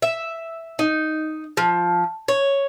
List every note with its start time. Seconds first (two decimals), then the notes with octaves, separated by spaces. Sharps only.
0.02 E5
0.79 D#4
1.57 F3
2.28 C#5